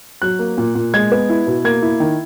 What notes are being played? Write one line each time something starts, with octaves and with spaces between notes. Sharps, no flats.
F#3 F#6
A#3
A#2
A#2
G#3 G#6
B3
E4
B2
A#3 G#6
E4
D#3